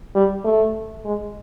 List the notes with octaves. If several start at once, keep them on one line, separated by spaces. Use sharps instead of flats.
G3
A3
G#3